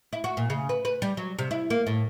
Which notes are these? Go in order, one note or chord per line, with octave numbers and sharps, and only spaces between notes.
E4
F#4
A#2
C#3
B4
B4
G3
F#3
C3
E4
A#3
A2